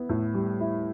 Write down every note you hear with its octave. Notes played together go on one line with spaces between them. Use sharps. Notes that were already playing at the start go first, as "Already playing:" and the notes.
Already playing: B3 E4
A2
G3
E4